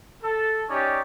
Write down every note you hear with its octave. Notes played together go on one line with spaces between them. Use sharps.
A4
C#4 D#4 G4 C#5 D5